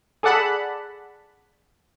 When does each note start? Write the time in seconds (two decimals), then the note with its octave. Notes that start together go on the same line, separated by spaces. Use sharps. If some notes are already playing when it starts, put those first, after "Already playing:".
0.23 G#4 A4 D5 F#5 A5 B5